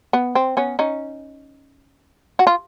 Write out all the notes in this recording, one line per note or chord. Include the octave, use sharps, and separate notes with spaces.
B3
C4
B3 C#4
C#4 D#4
F#4
F4